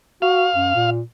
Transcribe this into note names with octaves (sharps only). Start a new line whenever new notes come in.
F#4 F5
F#2
A#2